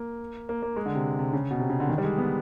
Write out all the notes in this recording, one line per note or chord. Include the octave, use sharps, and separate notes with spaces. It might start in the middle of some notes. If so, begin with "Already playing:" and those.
Already playing: A#3
A#3
A#3
G#3
D3
C3
C3
C#3
B2
C3
C#3
D3
D#3
G3
G#3
B3